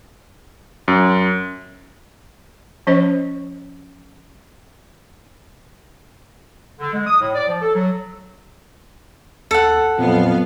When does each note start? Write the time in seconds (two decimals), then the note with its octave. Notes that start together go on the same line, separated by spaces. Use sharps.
0.88 F#2
2.87 F3 C#4 C5 C#5 D#5
6.80 D3
6.93 G#3
7.07 D#6
7.21 A2
7.35 D5
7.48 F3
7.61 A4
7.74 F#3
9.51 D#2 A4 F#5
9.98 F2 A#2 F#3 B3 F5